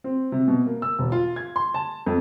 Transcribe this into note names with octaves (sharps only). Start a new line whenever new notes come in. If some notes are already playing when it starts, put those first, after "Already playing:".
C4
C3
B2
A#3
E6
E1
F4
G#6
C6
A5
F2